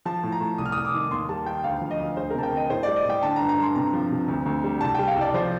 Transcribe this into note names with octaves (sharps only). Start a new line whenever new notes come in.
F3 A5
A2
A#5
A2
C2 D#6
F6
C2 D#6
D6
D#3
D#2 C6
G3 A5
D#3 G5
D2 F5
F3
D#5
D2
D2 C5
A#4
C3 A5
G5
D2 D#5
A2 C5
G3 D5
D#5
A2 G5
D3 A5
A#5
G2
A#5
G2 C6
C3 A#5
F3
C3
D2
D2
G3
C2 A5
G5
G3
F5
C2 D5
F3 C5